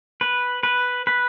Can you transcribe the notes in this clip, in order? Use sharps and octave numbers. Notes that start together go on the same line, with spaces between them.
B4
B4
B4